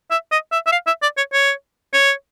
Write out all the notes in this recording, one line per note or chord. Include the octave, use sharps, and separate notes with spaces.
E5
D#5
E5
E5
F5
E5
D5
C#5
C#5
C#5